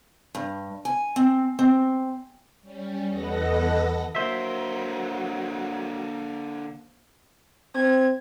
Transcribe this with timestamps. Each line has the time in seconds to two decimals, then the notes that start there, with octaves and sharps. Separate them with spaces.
0.35 G2
0.85 G#5
1.16 C4
1.59 C4
2.62 G3 C#4
3.09 E2 A4 B4 D#5 F#5 A#6
4.15 D3 F#3 A#3 A#4 C5 E5
7.75 C4 G#6